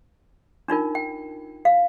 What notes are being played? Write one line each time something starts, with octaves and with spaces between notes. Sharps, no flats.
D4 D#4 F4 A#4
G5
F5